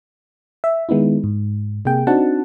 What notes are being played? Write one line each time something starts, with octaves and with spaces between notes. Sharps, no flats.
E5
D#3 G#3 B3 D#4 E4
G#2
C3 A#3 G#4 G5
C4 D4 D#4 F#4 F#5 A5